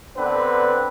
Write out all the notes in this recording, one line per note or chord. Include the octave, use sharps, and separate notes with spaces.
D3 B3 C4 D4 B4